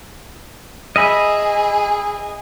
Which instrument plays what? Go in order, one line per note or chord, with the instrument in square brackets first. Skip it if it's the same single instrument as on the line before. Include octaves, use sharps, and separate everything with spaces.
[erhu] G#4 [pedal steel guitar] D#5 E5 B5